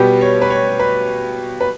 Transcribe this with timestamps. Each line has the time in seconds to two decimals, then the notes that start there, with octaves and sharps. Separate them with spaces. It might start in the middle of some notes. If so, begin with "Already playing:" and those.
Already playing: B2 G3 B3 G4
0.21 C#5
0.42 B4
0.50 C#5
0.79 B4
1.61 B4